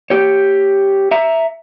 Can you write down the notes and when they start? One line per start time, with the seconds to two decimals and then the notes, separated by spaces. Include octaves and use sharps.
0.10 G4 C#5
1.11 E5 A#5